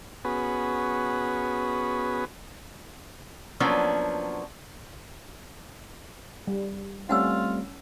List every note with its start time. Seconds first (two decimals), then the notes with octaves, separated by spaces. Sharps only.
0.25 B3 C#4 F#4 G#4 B4
3.60 F3 F#3 A#3 B3 C#4 D4
6.47 G3
7.09 G3 A3 C4 C#4 F4 F#5 G#5 E6